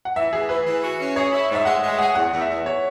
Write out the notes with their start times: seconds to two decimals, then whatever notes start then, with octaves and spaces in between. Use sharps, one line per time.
0.05 F#5
0.16 E3 E5
0.32 E3 G#4
0.49 E3 B4
0.65 E3
0.82 F#4
1.00 C#4
1.16 G#4 C#5
1.33 E4
1.49 G#2
1.55 E5
1.65 G#3 F#5
1.83 G#3
1.88 E5
1.98 G#4 F#5
2.15 E2 F#5
2.32 E2
2.41 E5
2.49 E2
2.66 C#5